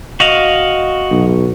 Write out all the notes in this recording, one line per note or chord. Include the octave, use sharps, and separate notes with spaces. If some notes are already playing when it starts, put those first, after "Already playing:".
F#4 D#5 F5
B1